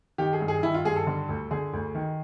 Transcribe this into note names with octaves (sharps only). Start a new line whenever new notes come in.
D#3 G4
G#4
G2
G#4
D#3 E4
F4
G2 G#4
A4
D3
D2
D3 G#4
D2
D#3